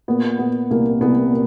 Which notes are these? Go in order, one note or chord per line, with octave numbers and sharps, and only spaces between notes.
A#2 B3
A#2 B3
C2 A#3
C2 B3
A#2